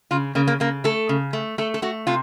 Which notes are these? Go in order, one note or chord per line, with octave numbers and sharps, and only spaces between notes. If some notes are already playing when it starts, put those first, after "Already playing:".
C#3 F4
C#3 A#3
A#3
C#3 A#3
A3 A4
C#3
A3
A3 A4
A4
A3 F#4
C3 F4